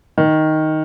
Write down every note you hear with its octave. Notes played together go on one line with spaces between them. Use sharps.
D#3